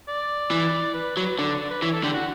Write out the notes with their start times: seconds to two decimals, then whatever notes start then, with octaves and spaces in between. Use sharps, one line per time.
0.08 D5
0.51 E3
0.94 B4
1.17 F#3 B4
1.38 D3 D5
1.60 D5
1.70 B4
1.82 E3 C#5
1.93 A4
2.04 D3 G4
2.14 F#4